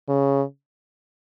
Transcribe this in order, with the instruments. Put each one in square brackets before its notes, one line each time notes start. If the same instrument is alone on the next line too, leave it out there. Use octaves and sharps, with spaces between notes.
[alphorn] C#3